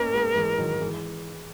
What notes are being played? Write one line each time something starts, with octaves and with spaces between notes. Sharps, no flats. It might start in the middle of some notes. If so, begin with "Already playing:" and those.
Already playing: A#3 B3 C#4 D#4 A#4
G#3 B3
E3 G#3
D#3 F#3
E3 G#3